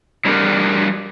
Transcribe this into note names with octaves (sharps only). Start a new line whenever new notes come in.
F#3 G3 D4 G4 A#4 B4